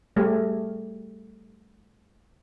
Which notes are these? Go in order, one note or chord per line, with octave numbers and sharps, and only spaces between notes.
G3 A3 G4 G#4